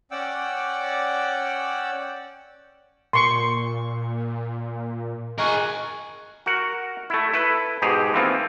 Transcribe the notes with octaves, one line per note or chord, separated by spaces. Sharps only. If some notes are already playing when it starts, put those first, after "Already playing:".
C#4 D5 F#5 G5 D6 E6
A#2 A#4 C6 C#6
G#4 A#4 D#5 C#6 F#6
F#4 A#4 F#5
A3 E4
E4 A4 B4
G#2 B2 D#4 G4 G#4
E3 F3 A#3 C4 D#4 F4